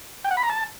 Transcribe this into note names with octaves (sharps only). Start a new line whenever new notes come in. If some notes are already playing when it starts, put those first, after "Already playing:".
G5
F#5
B5
A#5
A5